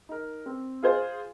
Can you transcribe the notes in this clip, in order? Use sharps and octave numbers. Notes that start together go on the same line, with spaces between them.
D#4 A#4
C4
F4 G#4 C5 F5